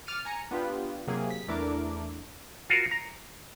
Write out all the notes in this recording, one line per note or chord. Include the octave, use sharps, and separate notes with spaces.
D6 F6 A6 C#7 D#7
G#5 A#5 C#7
B3 D4 F4 G4 B4
C3 F#3 A#3 G#4
B6
E2 A3 D4 E4 A#4 D6
F4 F#4 A#4
A#5